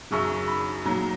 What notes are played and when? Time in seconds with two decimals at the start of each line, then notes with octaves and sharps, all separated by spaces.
0.11 F#2 C#3 F#3 C#6
0.48 B5
0.85 A#2 F#3 A#5